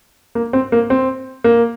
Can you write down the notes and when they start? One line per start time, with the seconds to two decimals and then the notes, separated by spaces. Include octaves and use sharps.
0.35 A#3
0.53 C4
0.72 A#3
0.90 C4
1.44 A#3